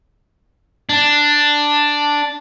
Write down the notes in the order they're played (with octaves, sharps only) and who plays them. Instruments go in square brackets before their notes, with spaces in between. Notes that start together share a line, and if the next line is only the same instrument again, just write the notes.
[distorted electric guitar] D4